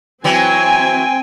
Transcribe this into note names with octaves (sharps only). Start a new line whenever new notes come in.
E3 F#3 C4 G5 G#5